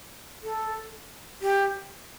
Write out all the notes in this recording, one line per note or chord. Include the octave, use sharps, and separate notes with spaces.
A4
G4